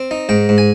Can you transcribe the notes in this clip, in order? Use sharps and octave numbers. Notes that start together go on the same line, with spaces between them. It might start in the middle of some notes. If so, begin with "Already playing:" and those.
Already playing: C4
D#4
G#2 G5
G#2
G#5